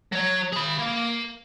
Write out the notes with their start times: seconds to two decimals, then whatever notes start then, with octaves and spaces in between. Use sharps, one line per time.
0.12 F#3 C#5
0.53 G#4 B5
0.79 A#3